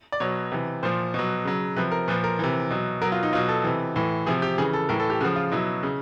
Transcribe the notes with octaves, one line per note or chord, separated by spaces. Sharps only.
D5
B2 F#3 C#5
C3 E3
A#2 F3 C5
B2 F#3
C#3 F#3
C3 F3 B4
A#4
A#2 F3 B4
A#4
C3 E3
B2 F#3
B2 F#3 A#4
F4
D#4
B2 F#3 F4
A4
C3 E3
A2 E3
C3 F3 G#4
G4
C#3 E3 G#4
A4
A2 E3 A#4
A4
G4
C#3 F3 F#4
F4
B2 F#3 E4
C#3